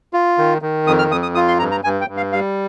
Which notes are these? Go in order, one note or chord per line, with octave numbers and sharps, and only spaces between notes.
F4
D#3
D#3
F2 D#6
F6
F2 D#6
D#6
F4 D#6
C6
G2 A#5
A#5
G2 G#5
G5
G2
F5
G3 F5